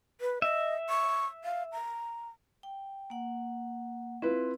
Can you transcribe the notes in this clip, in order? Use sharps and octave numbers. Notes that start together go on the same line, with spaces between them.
B4
D#5 E5
C#6
F5
A#5
G5
A#3 F#5
C4 E4 F4 B4